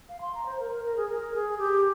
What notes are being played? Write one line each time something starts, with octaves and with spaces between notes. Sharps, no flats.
F5
C6
A#5
C5
A#4
A#4
A#4
G#4
A#4
G#4
G4